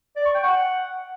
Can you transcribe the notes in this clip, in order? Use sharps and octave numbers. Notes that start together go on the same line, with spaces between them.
D5
C#6
G5
F#5